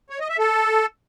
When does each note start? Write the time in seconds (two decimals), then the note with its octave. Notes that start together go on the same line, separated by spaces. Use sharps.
0.10 C#5
0.19 D#5
0.29 E5
0.39 A4